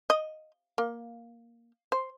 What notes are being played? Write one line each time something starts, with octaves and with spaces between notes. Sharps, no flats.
D#5
A#3
C5